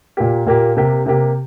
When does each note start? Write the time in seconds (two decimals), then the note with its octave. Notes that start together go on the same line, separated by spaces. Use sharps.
0.17 A#2 A#3 G4
0.46 A#2 A#3 G4
0.77 C3 A#3 G4
1.06 C3 A#3 G4